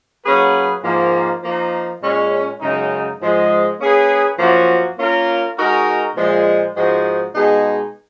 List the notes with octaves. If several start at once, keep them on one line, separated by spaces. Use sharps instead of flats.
F#3 A#3 C#4 G#4 B4
G#2 F3 A#3
F3 A#3 D#4
A#2 G#3 C#4
F#2 C#3 G#3 D#4
G#2 F3 G#3
A#3 C#4 G#4 B4
F#2 F3 A#3 C#4 F#4
A#3 C#4 F4 A#4
G#3 D#4 F#4 A#4
A#2 F3 G#3
G#2 F3 G#3 D#4 F#4
B2 G#3 D#4 G#4